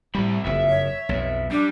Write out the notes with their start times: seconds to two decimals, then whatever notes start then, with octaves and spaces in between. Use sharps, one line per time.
0.15 A2 C3 G3 B5
0.45 F#1 F2 E5
0.69 C#5
1.09 B1 F2
1.51 G3 D4